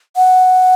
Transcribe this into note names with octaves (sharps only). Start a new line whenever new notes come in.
F#5